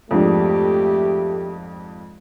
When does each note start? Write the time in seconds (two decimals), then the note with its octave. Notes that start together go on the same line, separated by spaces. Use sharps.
0.11 F2 G#2 A3 D4 G4